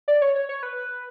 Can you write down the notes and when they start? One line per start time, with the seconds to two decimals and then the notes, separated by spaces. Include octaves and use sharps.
0.08 D5
0.22 C#5
0.36 C#5
0.49 C#5
0.63 B4